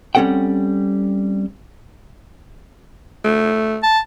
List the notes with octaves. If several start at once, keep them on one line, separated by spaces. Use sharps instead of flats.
G3 C4 C#4 A4 F#5 G5
A3
A5